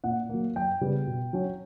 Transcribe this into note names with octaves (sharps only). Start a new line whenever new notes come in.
A#2 F#5
F#3 A#3
F#2 G5
C#3 G3 B3
B2
F#3 C#4